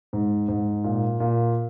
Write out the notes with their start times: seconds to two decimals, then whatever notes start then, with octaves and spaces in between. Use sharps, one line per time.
0.13 G#2
0.48 G#2
0.84 A#2
1.20 A#2